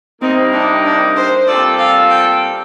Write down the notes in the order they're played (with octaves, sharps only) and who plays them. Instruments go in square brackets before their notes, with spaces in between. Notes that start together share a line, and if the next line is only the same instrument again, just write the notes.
[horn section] C3 G3 A#3 D#4 [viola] C4
[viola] D4
D4
C5
[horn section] A#2 G3 C4 F4 A4 [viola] D5
[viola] F5
G5